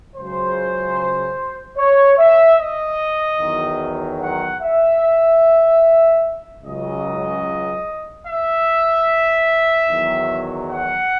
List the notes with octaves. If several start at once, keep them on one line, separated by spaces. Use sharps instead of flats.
C#2 C#3 F#3 C5
C#5
E5
D#5
E2 D#3 F#3
F#5
E5
C#2 C#3 F#3 D#5
E5
E2 D#3 F#3
F#5